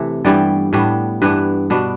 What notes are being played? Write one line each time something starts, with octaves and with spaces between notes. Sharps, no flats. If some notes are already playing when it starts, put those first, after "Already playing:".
Already playing: C3 E3 A3
G2 E3 G3 B3 D5
A2 G3 B3 D4
G2 E3 B3 D4 B4
B2 B3 D4